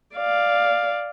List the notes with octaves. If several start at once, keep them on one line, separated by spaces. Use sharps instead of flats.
D5 F5